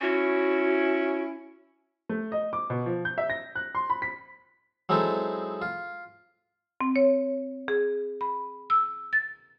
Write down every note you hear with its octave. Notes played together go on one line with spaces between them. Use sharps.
C#4 E4 F#4
A3
D#5
D6
B2
F3
G6
E5
A#6
F#6
C6
B5
B6
F#3 G#3 C4 D#4 E4 A4
F4
C4
C#5
G#4
B5
E6
A6